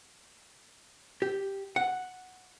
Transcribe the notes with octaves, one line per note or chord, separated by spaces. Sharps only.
G4
F#5